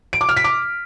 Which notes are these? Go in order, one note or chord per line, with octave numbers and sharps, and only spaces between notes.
D7
D6
F6
B6
D6